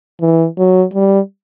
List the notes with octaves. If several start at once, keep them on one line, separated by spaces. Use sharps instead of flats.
E3
F#3
G3